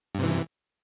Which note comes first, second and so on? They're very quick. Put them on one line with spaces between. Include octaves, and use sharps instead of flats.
G2 C3 E3